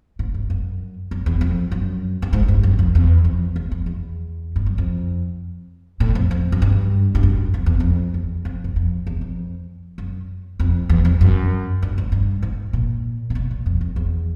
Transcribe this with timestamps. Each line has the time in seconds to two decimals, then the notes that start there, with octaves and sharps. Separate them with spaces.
0.19 G#2
0.34 G2
0.50 F#2
1.11 F#2
1.26 E2
1.41 F2
1.72 F#2
2.22 G2
2.33 G#2
2.48 G2
2.63 F#2
2.79 F2
2.95 E2
3.24 F2
3.56 E2
3.72 F2
3.86 E2
4.56 G2
4.66 F#2
4.78 F2
6.00 A2
6.15 F2
6.31 F2
6.52 F#2
6.62 G2
7.15 G2
7.23 F#2
7.54 F2
7.66 E2
7.80 F2
8.14 E2
8.45 F2
8.64 F#2
8.76 F2
9.07 E2
9.21 F2
9.98 F#2
10.60 F2
10.90 E2
11.05 F2
11.21 F#2
11.83 G2
11.98 G#2
12.12 G2
12.43 G#2
12.73 A#2
13.30 C3
13.35 B2
13.51 A#2
13.66 F2
13.81 F2
13.96 E2